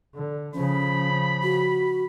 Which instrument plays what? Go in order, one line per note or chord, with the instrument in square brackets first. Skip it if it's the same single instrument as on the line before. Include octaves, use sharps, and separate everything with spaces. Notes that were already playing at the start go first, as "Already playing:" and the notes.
[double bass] D3
[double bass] C#3 F3 [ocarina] C#4 [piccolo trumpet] B5
[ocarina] F#4